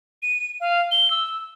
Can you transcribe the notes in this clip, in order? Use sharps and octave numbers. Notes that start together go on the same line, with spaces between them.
D#7
F5
G7
E6